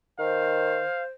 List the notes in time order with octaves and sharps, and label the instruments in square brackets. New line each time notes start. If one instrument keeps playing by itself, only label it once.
[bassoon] D#3 [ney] C5 [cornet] F5